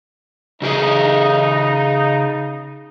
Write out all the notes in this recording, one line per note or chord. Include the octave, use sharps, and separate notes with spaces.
C#3 D#4 G4 G#4